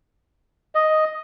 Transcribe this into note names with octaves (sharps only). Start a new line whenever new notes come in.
D#5